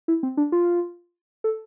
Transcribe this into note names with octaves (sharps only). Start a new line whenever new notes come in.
E4
C4
D4
F4
A4